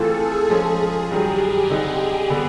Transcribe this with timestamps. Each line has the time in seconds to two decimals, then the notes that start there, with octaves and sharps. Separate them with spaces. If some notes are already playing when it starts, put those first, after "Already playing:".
Already playing: E3 A3 C4 F4 G#4 A4
0.50 F3 G#3 C#4 F4
1.10 G2 D#3 F#3 G4
1.70 D3 G3 C4 D#4
2.30 D3 G3 B3 D4